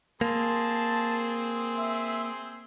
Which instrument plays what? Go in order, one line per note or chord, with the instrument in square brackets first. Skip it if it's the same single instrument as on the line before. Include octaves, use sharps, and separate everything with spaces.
[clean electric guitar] A#3 [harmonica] C4 G#4 C6 [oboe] A5
[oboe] E5